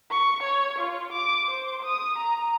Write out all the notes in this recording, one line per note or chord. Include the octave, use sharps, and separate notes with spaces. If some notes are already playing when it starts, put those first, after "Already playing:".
C#6
C#5
F4
D6
C5
D#6
A#5